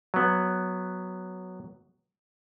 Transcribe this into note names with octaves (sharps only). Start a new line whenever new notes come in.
F#3 B3